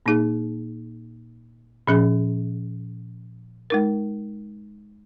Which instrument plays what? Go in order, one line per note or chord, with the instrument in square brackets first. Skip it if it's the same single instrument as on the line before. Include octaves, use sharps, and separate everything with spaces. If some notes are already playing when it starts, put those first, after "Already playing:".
[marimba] A#2 A#3 D#4 G#4
A#2 F3 C#4 G#4
G#3 D#4 A#4